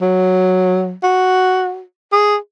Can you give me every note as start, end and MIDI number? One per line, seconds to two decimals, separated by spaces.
0.02 0.94 54
1.03 1.82 66
2.12 2.36 68